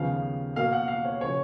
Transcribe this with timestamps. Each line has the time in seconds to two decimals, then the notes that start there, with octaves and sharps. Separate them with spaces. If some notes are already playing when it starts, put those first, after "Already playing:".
Already playing: D#2 C#3 F3 B3 F5
0.56 B2 A#3 F5
0.73 F#5
0.88 F5
1.05 C#5
1.21 C#3 F3 C#5